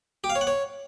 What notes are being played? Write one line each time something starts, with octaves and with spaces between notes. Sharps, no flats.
G4
F5
C#5
F#5
C#5